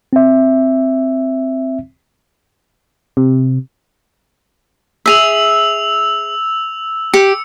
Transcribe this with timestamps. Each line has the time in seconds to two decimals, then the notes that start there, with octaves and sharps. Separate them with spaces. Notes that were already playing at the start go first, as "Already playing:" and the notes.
0.13 C4 E5
3.17 C3
5.06 G#4 E5 E6 F7
7.14 G4 C#7